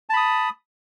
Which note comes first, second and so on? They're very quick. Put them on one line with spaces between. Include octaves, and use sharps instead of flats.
A5 B5 D#6